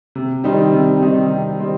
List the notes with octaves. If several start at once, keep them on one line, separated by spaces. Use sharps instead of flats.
C3
D#3 G3 C4 D#4
C3
D#3 G3 C4 D#4
C3
D#3 G3 C4 D#4